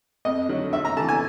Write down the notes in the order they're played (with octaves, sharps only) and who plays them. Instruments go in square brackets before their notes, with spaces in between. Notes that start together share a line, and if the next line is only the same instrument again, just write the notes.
[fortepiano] F2 D#5
D3 F#3 A3
G2 E5
A#5
E3 A3 A5
G#5